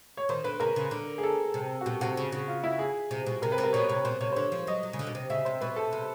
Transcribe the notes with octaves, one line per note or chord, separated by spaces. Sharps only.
C#5
D#3 C5
D3 B4
C#3 A#4
C#3
D3
G#4
A4
C3
F#4
B2 G4
C3 F#4
C#3
C#3
F4
E4
G#4
C3
B2
C3 A#4
B4
C3
A#4
B2 C#5
C3 C#5
B2 C5
C3 C#5
C5
D3 C#5
F3
F#3 D#5
F#3
C#3
D3
B2
C3
C#3 E5
C3 C5
B2 B4
A4
C3